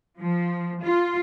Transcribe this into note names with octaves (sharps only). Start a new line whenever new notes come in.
F3
F4